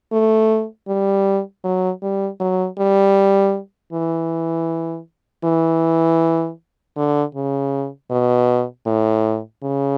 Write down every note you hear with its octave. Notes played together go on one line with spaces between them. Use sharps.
A3
G3
F#3
G3
F#3
G3
E3
E3
D3
C#3
B2
A2
C#3